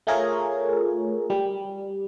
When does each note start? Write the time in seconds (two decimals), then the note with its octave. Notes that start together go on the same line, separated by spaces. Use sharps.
0.07 A3 F4 G#4 A#4 C#5
1.30 G3